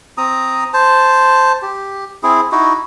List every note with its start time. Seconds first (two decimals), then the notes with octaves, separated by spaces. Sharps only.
0.17 C4 A#5 D#6
0.74 C5 A5
1.62 G4
2.23 C4 E4 G#4
2.52 D#4 E4 F#4